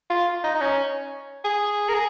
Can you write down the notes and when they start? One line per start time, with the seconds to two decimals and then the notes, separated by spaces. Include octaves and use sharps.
0.10 F4
0.44 D#4
0.55 D#4
0.61 C#4
1.44 G#4
1.89 A#4
1.94 G#4